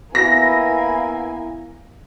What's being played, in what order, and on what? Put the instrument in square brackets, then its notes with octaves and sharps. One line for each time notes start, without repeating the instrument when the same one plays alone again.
[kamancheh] A#3 G#5 [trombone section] B3 E4 [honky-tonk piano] A#6